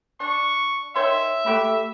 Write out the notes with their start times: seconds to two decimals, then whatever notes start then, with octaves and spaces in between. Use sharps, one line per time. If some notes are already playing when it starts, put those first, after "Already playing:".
0.20 D4 C#6
0.95 D#3 C#5 E5 C6
1.46 A3 F#4 G4 B5